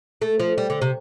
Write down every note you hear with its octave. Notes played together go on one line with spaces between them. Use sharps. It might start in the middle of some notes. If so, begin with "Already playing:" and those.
A3
F3
G3
D3
C3